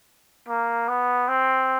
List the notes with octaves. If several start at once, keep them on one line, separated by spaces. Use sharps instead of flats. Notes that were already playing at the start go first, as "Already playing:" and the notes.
A#3
B3
C4